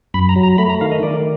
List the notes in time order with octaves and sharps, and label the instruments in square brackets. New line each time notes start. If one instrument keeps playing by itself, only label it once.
[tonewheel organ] F#2 B5
A#5
F#3
A#5
A3 B5
A#5
D#3 F5
D#5
D#3 D5